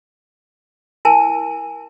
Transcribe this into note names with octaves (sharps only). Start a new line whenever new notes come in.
E4 A#4 G#5 A5